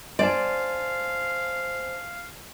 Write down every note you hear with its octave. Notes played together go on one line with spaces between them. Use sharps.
C5 D5 F5 G#5 A5